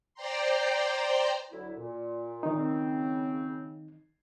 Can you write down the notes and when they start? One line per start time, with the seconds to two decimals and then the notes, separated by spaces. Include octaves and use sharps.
0.14 C5 D5 G5 A#5 C6
1.51 D2 F#3 E4
1.77 A#2
2.43 D#3 D#4
2.56 C#3 C4